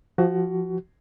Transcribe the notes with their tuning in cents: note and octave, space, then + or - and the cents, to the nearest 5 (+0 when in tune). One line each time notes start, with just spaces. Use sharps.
F3 +0 F#4 +25